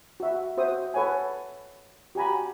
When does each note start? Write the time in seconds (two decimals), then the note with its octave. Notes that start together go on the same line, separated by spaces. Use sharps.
0.20 F#4 E5
0.57 F#4 C5 E5 D#6
0.94 A4 B4 C#5 F#5 G#5
2.15 F#4 G4 G#5 A#5 B5